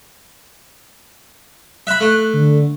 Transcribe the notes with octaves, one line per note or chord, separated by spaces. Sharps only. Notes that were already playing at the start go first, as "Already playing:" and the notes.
E5 B5 F#6
A3
D3